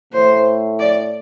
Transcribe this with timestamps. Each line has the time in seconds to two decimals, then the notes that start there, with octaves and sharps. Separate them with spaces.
0.13 A2 C5
0.79 D5